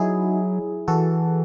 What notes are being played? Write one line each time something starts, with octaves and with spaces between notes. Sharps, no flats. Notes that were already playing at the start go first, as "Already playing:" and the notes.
Already playing: F#3 D#4 E4 F#4 G#4
E3 F#4 A4